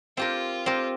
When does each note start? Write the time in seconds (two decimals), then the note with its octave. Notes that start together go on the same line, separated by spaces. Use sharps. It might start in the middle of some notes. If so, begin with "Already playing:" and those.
0.17 C4 F4 G4 A#4
0.66 C4 G4 A#4